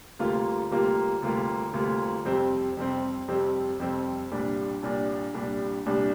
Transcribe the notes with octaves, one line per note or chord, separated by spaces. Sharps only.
D2 C3 G3 A#3 F4
D2 C3 G3 A#3 F4
D2 C3 G3 A#3 F4
D2 C3 G3 A#3 F4
F2 C3 G3 C4
F2 C3 G3 C4
F2 C3 G3 C4
F2 C3 G3 C4
C2 A#2 G3 D4
C2 A#2 G3 D4
C2 A#2 G3 D4
C2 A#2 G3 D4